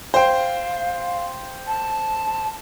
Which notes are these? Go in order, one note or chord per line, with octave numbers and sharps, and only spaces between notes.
C5 F5 G5
A5